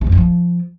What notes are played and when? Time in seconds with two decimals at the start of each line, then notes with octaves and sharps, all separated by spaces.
0.01 C3
0.07 F2
0.12 D3
0.17 F3